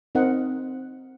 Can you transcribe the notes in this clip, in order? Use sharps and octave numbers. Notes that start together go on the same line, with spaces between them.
C4 D#4 A#4 D#5 F#5